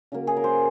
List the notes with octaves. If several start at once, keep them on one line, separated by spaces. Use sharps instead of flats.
C#3 F#3 A#3
G#4
A#4
C5